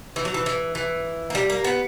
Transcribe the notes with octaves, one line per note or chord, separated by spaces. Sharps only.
E3
F#3
E3
E3
E3
A#3
G3
A#3
B3